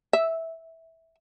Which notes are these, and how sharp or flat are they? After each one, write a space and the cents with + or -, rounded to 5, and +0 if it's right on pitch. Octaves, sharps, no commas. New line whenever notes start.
E5 -10